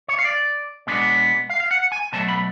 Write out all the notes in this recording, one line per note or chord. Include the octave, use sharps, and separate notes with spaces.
C#5
F5
D5
B2 G#3 B3 D4
F5
F5
F#5
G#5
B2 F#3 A3 A5
B5